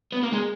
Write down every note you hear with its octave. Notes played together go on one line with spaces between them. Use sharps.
B3
A#3
G#3